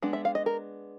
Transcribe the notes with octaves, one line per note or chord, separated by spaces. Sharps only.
G#3 B3 D4
E5
F5
D#5
A#4